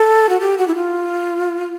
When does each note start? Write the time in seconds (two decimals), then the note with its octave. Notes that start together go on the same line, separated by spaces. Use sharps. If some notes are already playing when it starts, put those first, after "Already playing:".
Already playing: A4
0.29 F#4
0.41 G4
0.58 F#4
0.68 E4
0.75 F4